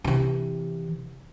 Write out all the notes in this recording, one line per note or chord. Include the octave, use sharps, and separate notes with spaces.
C3 E3